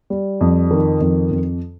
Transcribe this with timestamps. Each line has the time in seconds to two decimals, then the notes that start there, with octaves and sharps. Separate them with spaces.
0.10 G3
0.41 F2
0.71 D#3
1.01 F2
1.31 F2